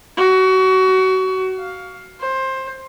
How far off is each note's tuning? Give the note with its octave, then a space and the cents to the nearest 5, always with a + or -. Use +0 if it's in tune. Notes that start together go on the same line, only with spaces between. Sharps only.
F#4 +25
F5 +10
C5 +15